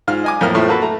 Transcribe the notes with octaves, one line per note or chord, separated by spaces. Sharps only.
G#2 F4 F6
D#5 G#5 D6
F2 A2 A#3 F6
A2 F3 A3 C4
A#3 F#4 A4 B4
A3 A#5